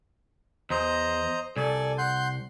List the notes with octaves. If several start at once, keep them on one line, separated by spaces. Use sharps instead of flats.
E2 C5 D#5 A#5
C2 A4 D5 G#5
F#5 C6 G6